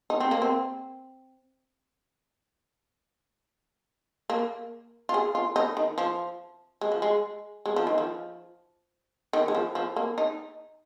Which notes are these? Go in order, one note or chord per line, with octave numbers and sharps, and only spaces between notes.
D#4
C4
A#3
C4
A#3
F4
G#4
F4
D#4
D#3
F3
G#3
F3
G#3
G#3
F3
D#3
F3
D#3
G#3
F3
F3
A#3
D#4